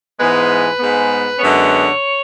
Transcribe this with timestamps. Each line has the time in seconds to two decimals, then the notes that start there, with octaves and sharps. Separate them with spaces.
0.19 G#2 E3 G#3 B3 B4
0.78 G#2 G#3 B3
1.38 F#2 D3 G#3 B3 C#5